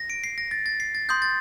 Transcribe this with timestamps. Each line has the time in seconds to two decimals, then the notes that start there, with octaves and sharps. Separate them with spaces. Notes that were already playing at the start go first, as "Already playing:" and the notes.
Already playing: A#6
0.10 D7
0.24 C7
0.38 A#6
0.51 A6
0.66 A6
0.80 C7
0.95 A6
1.09 C6 D#6 G6
1.22 A6